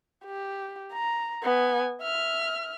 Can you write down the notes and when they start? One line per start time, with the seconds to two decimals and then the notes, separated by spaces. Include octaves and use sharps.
0.25 G4
0.93 A#5
1.43 B3 G#5
2.01 E5 F6